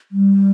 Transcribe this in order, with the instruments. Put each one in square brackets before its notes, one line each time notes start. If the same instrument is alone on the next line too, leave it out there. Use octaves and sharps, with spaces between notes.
[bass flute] G3